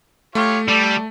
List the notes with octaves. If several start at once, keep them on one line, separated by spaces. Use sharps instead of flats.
A3 F4 G4 C#5
G3 A4 D5